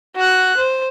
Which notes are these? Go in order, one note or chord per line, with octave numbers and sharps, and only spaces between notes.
F#4 F#6
C5